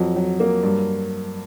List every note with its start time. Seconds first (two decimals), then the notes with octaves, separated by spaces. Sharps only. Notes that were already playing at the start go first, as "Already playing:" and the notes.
Already playing: F2 F#3
0.16 F#3
0.40 A#3
0.63 G2